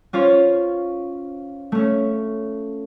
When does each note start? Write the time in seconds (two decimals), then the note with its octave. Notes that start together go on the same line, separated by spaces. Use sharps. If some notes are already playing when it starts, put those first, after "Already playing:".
0.13 C#4 F4 C5 C#5
1.72 A3 C#4